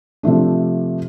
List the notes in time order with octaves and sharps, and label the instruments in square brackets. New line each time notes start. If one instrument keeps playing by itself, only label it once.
[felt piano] C3 F3 A3 D4